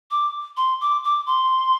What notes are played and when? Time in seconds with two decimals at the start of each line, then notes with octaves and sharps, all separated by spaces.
0.11 D6
0.57 C6
0.81 D6
1.04 D6
1.27 C6